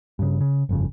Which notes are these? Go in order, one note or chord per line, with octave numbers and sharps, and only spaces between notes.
G2 C#3
C#3
G1 F2 C#3